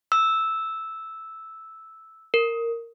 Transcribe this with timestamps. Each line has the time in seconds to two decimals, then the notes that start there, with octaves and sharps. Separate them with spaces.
0.12 E6
2.34 A#4